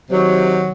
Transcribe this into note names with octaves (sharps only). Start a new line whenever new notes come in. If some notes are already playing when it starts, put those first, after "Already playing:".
C3 D#3 F#3